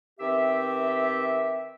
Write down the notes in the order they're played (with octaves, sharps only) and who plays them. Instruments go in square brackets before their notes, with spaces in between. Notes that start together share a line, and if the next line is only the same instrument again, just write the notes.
[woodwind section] D#3 B3 C4 G4 E5